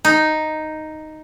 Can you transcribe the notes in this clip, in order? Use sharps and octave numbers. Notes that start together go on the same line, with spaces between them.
D#4